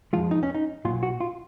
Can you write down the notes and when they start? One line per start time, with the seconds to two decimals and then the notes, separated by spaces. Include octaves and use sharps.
0.13 F2 F3 G#3 F4
0.31 D#4
0.43 C#4
0.54 D#4
0.85 B1 A#2 F#3 F4
1.03 F#4
1.20 F4